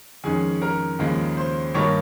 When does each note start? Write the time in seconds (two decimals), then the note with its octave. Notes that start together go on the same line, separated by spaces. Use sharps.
0.24 F2 D#3 G#3 C#4 G#4 G#5
0.62 A#4 A#5
0.99 D#2 C#3 F3 G#3
1.37 C5 C6
1.74 G2 D#3 A#3 D#4 C#5 C#6